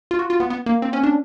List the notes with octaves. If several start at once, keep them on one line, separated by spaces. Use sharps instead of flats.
F4
F#4
F4
B3
B3
A#3
C4
C#4
D4